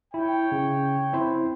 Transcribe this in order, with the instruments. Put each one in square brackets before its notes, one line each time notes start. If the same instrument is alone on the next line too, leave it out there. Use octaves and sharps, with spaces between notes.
[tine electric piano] E4 [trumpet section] C#5 G5
[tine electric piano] C#3
C4 E4 C5